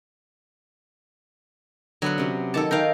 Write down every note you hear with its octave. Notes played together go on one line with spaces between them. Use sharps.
D3 F#3 B3 F#5
C3 C#4 F#4
D#3 A4 C#5 A5 D6
D#3 D#4 A#4 F5 G5